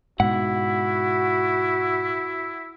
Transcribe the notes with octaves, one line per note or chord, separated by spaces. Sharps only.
G#2 B2 E4 F#4 F#5